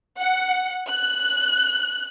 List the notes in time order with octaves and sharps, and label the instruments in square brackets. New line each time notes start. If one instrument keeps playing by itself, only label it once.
[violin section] F#5
F#6